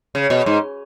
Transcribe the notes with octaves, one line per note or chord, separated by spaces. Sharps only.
C#3
B2
G#2